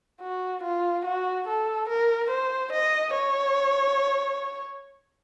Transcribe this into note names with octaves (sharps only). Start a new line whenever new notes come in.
F#4
F4
F#4
A4
A#4
C5
D#5
C#5